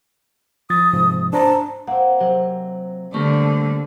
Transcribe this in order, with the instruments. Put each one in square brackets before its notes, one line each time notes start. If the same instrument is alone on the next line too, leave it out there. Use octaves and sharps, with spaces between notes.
[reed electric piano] F3 A6 [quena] D#6
[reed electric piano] G#2 C3 F3
[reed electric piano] D4 C5 A#5 [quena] A5
[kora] A#3 C4 [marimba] F#5
[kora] C3 [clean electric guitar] F#3
[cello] D3 [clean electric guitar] G3 A3 A#3 [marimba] C#6